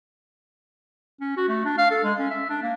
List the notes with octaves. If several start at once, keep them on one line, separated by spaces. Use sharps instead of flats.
C#4
F#4
A3
D4
F5
A4
G#3
C#4
E5
D4
A#3